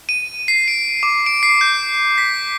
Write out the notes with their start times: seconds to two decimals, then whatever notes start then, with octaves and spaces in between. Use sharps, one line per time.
0.09 D#7
0.48 C7
0.68 D7
1.03 D6
1.26 D7
1.43 C7
1.61 G6
2.18 B6